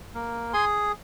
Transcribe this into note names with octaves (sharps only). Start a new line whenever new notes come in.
A#3
G#4 G#5 C6